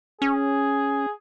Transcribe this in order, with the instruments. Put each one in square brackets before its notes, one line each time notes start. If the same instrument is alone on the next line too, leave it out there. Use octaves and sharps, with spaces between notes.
[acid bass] C#4 [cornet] G#4